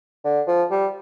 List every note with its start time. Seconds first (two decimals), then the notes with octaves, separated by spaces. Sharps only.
0.25 D3
0.47 F3
0.71 G3